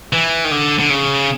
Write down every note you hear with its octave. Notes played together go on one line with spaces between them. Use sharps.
E3
D#3
D3
D3
C#3